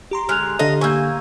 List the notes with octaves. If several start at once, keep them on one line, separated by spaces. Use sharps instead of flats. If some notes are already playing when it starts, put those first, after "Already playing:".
G4 A#5 C6
D3 G#3 F6 F#6 F7
D3 A4 D#5 F5
A#3 G#5 C#6 E6 G6